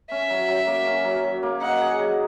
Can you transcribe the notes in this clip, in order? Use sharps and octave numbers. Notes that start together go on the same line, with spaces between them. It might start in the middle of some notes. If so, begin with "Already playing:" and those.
C#4 E5
F#3
F#3
A#3
C#4
F#3
F#3
A#3
D#4 F#5
G#4
F#3